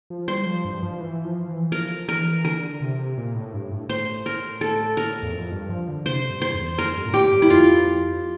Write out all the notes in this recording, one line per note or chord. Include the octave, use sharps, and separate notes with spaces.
F3
G3 C5
F3
G2
F3
E3
F3
E3
F3 A#4
E3 A#4
D3 A#4
C3
A#2
A2
G2
A2
A2 C5
A#4
A4
A#4
E2
F2
G2
F3
D3
C3 C5
G2
C5
E2
F2 A#4
G2
A#2
A2 G4
G2
E4
F2 F4
F2